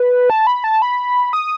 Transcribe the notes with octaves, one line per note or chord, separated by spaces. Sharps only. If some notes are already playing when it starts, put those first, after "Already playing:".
Already playing: B4
A5
B5
A5
B5
D#6